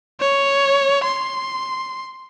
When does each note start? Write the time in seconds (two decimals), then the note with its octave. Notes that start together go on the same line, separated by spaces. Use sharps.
0.20 C#5
1.05 C6